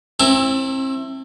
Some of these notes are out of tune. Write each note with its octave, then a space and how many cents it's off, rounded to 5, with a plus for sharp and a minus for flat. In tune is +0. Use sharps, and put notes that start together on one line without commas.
C4 +35 E4 +0 A5 +25